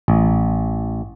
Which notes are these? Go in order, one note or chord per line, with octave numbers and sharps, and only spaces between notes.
A1